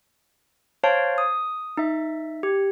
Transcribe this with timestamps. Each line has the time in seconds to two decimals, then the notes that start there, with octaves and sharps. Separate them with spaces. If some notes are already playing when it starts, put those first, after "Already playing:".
0.83 C5 C#5 F5 A5
1.18 D#6
1.77 D#4 E5
2.43 G4